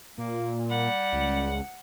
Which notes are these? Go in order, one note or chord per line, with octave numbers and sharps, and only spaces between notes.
A#2 A#3
G3 F#5
C#2